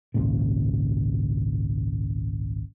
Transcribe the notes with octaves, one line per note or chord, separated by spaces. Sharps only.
G#1 C#2 A#2 C#3